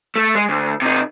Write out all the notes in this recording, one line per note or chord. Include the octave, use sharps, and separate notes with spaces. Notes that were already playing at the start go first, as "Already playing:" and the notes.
A3
G#3
D2
C3 D#4